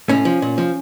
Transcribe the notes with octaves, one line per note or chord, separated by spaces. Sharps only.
A2 C#4
F3
A#2
F3